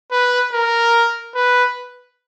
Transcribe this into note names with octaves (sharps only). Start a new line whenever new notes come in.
B4
A#4
B4